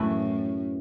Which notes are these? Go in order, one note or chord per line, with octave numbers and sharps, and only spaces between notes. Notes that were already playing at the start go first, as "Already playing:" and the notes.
Already playing: F#2 A2 E3 A3 E4 B4